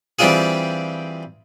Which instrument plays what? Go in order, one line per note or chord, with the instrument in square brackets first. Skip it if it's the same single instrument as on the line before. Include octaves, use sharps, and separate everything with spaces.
[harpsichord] E3 G3 C4 D4 F4 G#4